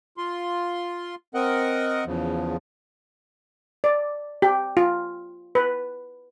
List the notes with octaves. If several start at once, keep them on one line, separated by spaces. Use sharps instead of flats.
F4 C6
C4 A#4 D#5 F#5
E2 C#3 F3
D5
G4
F4
B4